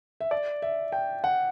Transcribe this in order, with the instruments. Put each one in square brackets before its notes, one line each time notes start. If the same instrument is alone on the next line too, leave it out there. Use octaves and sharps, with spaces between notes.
[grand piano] E5
D5
E5
G5
F#5